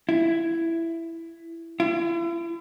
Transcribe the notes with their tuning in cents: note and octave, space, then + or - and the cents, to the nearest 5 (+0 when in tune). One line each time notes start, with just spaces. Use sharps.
E4 +10
E4 +40